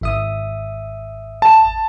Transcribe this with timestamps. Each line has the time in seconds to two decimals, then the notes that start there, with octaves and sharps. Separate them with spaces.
0.01 G#1 E5 D#6
1.42 A5